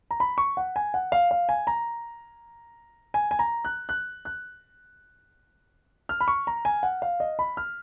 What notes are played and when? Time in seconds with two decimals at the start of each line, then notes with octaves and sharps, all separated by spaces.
0.11 A#5
0.20 B5
0.38 C#6
0.57 F#5
0.76 G#5
0.94 F#5
1.12 F5
1.31 F5
1.49 G#5
1.67 A#5
3.14 G#5
3.31 G#5
3.39 A#5
3.65 F#6
3.89 F#6
4.25 F#6
6.09 F6
6.21 B5
6.28 C#6
6.47 A#5
6.65 G#5
6.83 F#5
7.02 F5
7.20 D#5
7.39 B5
7.57 F6